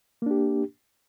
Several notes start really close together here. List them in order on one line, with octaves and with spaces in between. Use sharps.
A#3 D4 G4